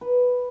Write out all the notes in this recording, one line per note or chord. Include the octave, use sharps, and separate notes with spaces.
B4